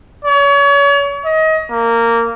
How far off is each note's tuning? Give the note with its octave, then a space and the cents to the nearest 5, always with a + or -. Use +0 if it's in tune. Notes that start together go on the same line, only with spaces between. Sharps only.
C#5 +35
D#5 +30
A#3 -15